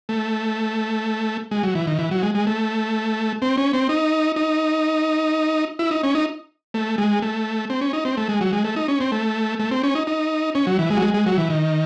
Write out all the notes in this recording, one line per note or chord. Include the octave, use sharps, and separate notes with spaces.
A3
G#3
F#3
E3
D#3
E3
F#3
G#3
G#3
A3
C4
C#4
C4
D#4
D#4
E4
D#4
C#4
D#4
A3
G#3
A3
C4
C#4
D#4
C4
A3
G#3
F#3
G#3
A3
D#4
C#4
C4
A3
A3
C4
C#4
D#4
D#4
C#4
F#3
E3
G#3
F#3
G#3
G#3
F#3
E3
D#3